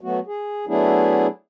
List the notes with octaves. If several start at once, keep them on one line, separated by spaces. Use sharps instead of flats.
F#3 A3 B3 F#4
G#4
F#3 A3 B3 D4 E4 G#4